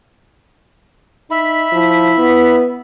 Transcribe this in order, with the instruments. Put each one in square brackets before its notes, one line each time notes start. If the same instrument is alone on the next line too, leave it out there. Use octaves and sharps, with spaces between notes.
[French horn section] D#4 [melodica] E5 B5
[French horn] F3 [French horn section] E4
[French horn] B3